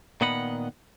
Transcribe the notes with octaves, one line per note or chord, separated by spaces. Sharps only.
A#2 D#3 B3 D#5 F#5 B5